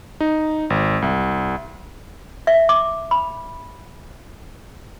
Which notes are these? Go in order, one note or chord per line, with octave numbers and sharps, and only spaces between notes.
D#4
G#1
C2
E5
D6
B5